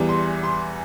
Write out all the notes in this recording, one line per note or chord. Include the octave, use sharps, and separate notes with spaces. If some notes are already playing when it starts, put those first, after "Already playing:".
Already playing: E2 E3 G3
C6
C6